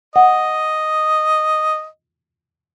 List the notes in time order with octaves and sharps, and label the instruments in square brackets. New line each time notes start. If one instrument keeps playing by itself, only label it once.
[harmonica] D#5 [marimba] F#5